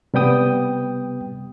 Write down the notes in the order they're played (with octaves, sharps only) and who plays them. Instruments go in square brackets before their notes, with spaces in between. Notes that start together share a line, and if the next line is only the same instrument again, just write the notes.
[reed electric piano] C3 G3 B3 G5 D#6